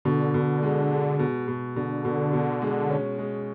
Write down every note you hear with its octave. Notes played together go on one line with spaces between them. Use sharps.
B2 D3
B2
G#3
G#3
B2
B2
B2 D3
B2
B2
G#3
C#4
G#3